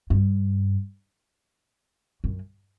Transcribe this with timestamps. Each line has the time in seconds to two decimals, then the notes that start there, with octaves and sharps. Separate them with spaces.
0.10 G2
2.24 F#2